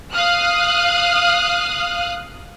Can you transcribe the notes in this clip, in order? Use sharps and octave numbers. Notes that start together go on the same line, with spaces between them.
F5 D#6 F6 F#6